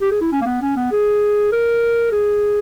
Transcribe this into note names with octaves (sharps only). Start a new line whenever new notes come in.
G4
G#4
E4
C#4
A#3
B3
C#4
B3
G#4
A#4
G#4